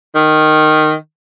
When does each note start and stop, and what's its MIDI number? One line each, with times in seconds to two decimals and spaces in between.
0.15 0.93 51